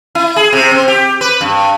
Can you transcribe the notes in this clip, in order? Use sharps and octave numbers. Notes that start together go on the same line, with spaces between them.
E4
G#4
C3
C4
G4
B4
G2